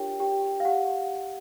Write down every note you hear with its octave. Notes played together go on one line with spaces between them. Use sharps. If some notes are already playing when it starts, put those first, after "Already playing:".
Already playing: D4 F4 G4 A#4 C#5 G5
G4 G5
F5
G4 F#5